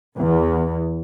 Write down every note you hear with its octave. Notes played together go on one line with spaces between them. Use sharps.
E2